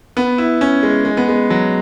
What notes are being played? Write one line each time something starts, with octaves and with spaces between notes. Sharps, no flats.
B3
E4
C#4
G#3
G#3
B3
G#3
F#3